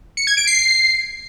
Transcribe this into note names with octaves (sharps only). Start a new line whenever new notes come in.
C#7
G#6
D7
C7